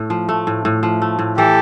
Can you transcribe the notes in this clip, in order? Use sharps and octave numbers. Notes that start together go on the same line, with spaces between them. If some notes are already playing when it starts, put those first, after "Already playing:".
Already playing: A2 A3
F3
A3
A2
A2
F3
A3
A2
E3 G4 A4